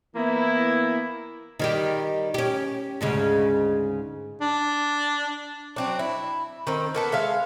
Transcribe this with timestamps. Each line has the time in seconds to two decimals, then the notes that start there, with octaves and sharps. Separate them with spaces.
0.15 E3 A#3 B3 E4
1.59 D#3 G3 G4
2.34 C#4 G4
3.01 D2 G#2 C#3
4.41 D4
5.76 F#3 C4 D4
5.99 E4
6.67 D#3 C4
6.95 A#3 B3 A4
7.12 G#3 E5 F5